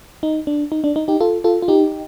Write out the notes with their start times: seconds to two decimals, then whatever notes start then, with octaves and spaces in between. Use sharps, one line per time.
0.23 D#4
0.47 D4
0.72 D#4
0.84 D4
0.96 D#4
1.08 D#4 G4
1.20 F4 A4
1.44 F4 A4
1.62 F4
1.68 D#4 G4